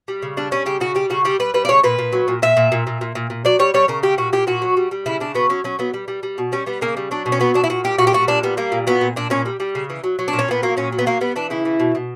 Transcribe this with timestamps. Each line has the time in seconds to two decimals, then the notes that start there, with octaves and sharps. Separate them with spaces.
0.08 G3
0.22 C#3
0.37 G3 D4
0.52 G3 C#4
0.66 C#3 G4
0.80 C#3 F#4
0.95 G3 G4
1.10 C#3 F#4
1.25 G3 G4
1.40 G3 B4
1.54 G3 B4
1.65 D5
1.68 C#3 C#5
1.84 A#2 B4
1.99 A#2
2.13 F#3
2.28 A#2
2.42 A#2 E5
2.57 A#2
2.72 A#2
2.87 A#2
3.01 A#2
3.15 A#2
3.30 A#2
3.45 F#3 D5
3.59 G3 C#5
3.74 G3 C#5
3.88 C#3 A#4
4.03 G3 G4
4.18 A#2 F#4
4.33 A#2 G4
4.47 A#2 F#4
4.62 F#3
4.77 G3
4.91 G3
5.06 C#3 E4
5.20 C#3 D4
5.35 F#3 B3
5.50 F#3 C#4
5.64 F#3 C#4
5.79 F#3 B3
5.94 G3
6.08 G3
6.23 G3
6.38 B2
6.52 G3 C#4
6.66 G3 B3
6.81 C#3 A#3
6.97 G3
7.11 F#3 D4
7.26 B2
7.32 C#4
7.40 F#3 B3
7.54 B2 D4
7.64 E4
7.70 A#2 F#4
7.84 G3 G4
7.99 A#2 F#4
8.07 G4
8.13 G3 F#4
8.28 A#2 D4
8.43 G3 B3
8.57 G3 A#3
8.72 A#2
8.87 F#3 B3
9.01 A#2
9.16 A#2 D4
9.30 A#2 C#4
9.46 G3
9.60 G3
9.75 C#3
9.90 E3
10.04 F#3
10.19 F#3
10.28 D4
10.33 A#2
10.39 C#4
10.48 A#2 B3
10.63 F#3 A#3
10.77 A#2 C#4
10.92 F#3
10.99 B3
11.06 F#3 A#3
11.21 G3 B3
11.36 E3 D4
11.50 C#3 E4
11.65 E3
11.80 B2
11.95 B2